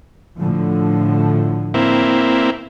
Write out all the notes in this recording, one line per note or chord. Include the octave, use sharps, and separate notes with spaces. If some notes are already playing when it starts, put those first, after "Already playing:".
A2 D3 F3
A#3 C4 E4